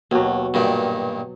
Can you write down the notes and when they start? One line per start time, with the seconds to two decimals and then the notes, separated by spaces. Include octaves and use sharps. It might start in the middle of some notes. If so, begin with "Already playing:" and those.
0.11 D#2 B2 F#3
0.54 G2 A#2 D#3